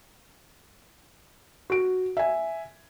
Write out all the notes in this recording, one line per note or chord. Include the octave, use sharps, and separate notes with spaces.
F#4 D7
E5 G#5